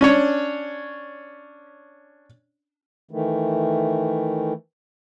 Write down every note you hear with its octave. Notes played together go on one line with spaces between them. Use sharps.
C#4 D4 C#5
D#3 E3 A3